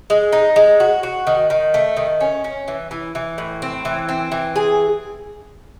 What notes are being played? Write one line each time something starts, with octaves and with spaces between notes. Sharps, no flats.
G#3
D#4
G#3
F#4
F#4
D#3
D#3
A3
D#3
C#4
C#4
E3
E3
E3
A2
C4
E3
C4
E3
G#4